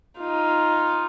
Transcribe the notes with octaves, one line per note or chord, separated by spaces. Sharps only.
D#4 F4